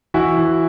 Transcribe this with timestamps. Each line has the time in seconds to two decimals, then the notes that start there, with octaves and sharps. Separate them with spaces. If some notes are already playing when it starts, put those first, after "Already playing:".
0.14 E3 E4 F#4
0.37 E3